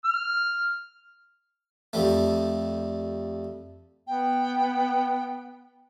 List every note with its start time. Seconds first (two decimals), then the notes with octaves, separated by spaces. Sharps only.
0.04 F6
1.93 F2 G3 A3
4.07 B3 G5